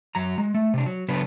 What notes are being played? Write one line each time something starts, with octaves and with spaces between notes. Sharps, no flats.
F#2 F#3 A#5
G#3
A3
C3 D4
F#3
C#3 F#3 B3 D4 B4